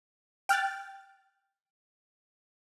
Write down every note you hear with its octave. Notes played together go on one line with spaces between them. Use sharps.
G5 F6 F#6 A6